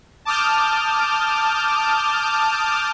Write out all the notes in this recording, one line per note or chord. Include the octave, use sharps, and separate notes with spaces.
A5 D6 D#6 F6 G6